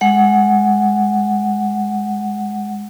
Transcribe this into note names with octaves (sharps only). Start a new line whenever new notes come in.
G#3 F#5